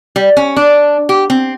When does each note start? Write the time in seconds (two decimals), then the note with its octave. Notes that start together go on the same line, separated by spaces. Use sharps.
0.16 G3
0.37 C#4
0.56 D4
1.09 G4
1.30 C4